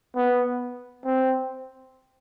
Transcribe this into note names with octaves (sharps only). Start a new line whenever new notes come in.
B3
C4